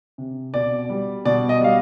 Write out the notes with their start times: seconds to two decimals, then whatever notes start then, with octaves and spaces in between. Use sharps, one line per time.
0.18 C3
0.54 B2 D5
0.90 G3
1.25 B2 D5
1.49 D#5
1.61 G3 F5